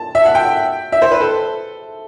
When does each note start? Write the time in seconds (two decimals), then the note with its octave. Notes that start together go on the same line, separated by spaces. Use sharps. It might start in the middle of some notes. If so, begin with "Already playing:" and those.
Already playing: A5
0.15 E5
0.25 F#5
0.35 G5
0.92 E5
1.02 C5
1.11 B4
1.21 A4